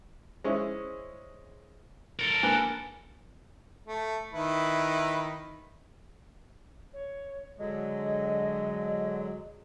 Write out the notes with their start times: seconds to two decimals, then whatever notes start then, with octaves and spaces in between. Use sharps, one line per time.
0.44 G#3 C#4 E4 C5
2.19 A4 A#4
2.43 A#3 D4 B4 F#6
3.87 A3
4.33 D#3 E4 B4
6.93 C#5
7.58 D3 F#3 G#3 D#5